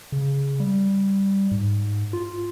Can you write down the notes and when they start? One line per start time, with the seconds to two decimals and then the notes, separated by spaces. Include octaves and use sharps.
0.12 C#3
0.60 G3
1.51 G#2
2.13 F4